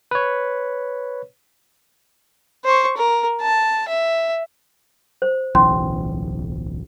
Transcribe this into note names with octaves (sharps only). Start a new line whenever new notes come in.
B4 C#5
C5 C#6
A#4
A5
E5
C5
D1 B1 E3 C#4 C6